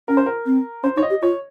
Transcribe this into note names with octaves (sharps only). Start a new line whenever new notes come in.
C#4 A#4
C5
A#4
C4
C#4 C5
D#4 C#5
D#5
G4
F4 C#5